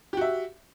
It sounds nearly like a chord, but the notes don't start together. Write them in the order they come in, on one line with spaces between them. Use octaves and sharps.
G4 F#4 E5